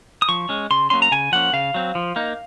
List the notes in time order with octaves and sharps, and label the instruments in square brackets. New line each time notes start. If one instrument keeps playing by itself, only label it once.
[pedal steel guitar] D#6
F3 C#6
G#3 C#4
C#3 C6
F#3 A#3 C#4 C6
A#5
C#3 G#5
F3 A#3 C#4 F#5
C#3 F5
F#3 C4
F3
A#3 D#4